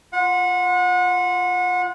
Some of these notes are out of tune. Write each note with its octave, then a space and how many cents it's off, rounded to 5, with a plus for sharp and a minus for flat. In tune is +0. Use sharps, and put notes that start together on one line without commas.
F4 -10 F#5 -30